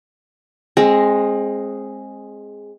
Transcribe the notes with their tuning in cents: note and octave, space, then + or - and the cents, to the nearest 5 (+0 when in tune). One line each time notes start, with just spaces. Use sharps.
G#3 +0 C4 +25